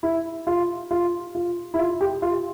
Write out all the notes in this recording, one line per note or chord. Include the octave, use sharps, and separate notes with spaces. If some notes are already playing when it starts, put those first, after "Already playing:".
E4
F4
F4
F4
E4
F4
G4
F4